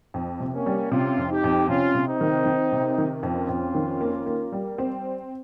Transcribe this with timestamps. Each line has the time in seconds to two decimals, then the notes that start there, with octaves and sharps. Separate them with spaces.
0.14 F2
0.40 C3
0.54 A#3 C#4
0.66 G3
0.92 C3 C#4 F4
1.18 F2
1.30 D#4 G4
1.44 F2
1.68 C3 C#4 F4
1.95 C3
2.08 C4 D#4
2.21 D#3
2.46 D#3
2.72 C3
2.98 D#3
3.23 F2 C#4 F4
3.49 F2
3.75 D#3
4.00 A#3
4.26 A#3
4.52 G3
4.78 C4